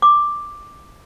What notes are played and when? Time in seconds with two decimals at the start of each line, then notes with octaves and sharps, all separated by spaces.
0.02 D6